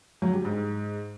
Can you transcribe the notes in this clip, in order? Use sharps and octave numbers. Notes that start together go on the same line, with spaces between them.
F#3
G3
G#2